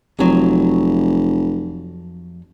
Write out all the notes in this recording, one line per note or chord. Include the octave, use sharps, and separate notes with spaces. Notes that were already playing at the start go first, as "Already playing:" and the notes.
F1 F2 F#3